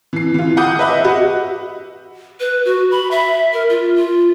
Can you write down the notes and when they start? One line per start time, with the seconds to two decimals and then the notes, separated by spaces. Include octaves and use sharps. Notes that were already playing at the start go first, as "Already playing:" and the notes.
0.13 E3 C7
0.34 E3 F4
0.57 F#5 B5 D6 D#6 G6
0.79 B4 D#5 E5 B5
1.04 F#4 D#5
2.40 B4
2.65 F#4
2.91 B5
3.11 E5
3.53 A#4
3.70 F4
3.96 F4